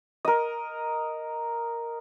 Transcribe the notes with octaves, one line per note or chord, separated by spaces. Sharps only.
A#4 D#5